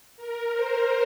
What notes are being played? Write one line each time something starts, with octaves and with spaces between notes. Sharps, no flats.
A#4
C5